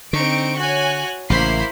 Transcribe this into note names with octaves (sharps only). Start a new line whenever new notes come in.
D3 C4 D#4 C#6 D7
F#4 C#5 G#5 F#6
A1 C#3 A#3 E4 C5 B5 C7